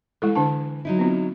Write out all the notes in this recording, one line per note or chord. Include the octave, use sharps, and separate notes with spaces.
E3 G#3 E4 A4
D3 D4 A5
F#3 D#4 E4
B3 C4 F4